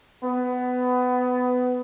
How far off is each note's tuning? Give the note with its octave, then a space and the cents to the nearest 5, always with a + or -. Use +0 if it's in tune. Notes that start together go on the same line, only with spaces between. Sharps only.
B3 +20